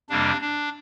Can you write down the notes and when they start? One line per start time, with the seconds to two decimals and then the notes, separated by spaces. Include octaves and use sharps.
0.10 F2 C3 G3 A#3 D4
0.41 D4